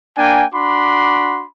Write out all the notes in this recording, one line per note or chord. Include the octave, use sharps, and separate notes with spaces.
A#3 D4 G5 G#5
D4 F#4 B5 C6 D6